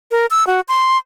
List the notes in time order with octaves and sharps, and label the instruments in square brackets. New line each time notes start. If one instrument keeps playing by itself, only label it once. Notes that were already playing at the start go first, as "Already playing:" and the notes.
[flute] A#4
E6
F#4
C6